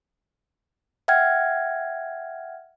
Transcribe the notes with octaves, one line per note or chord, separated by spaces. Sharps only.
E5 F#5 G5 F6 G#6